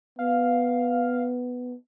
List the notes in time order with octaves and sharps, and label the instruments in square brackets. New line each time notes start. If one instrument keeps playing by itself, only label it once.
[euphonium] B3 [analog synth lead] F5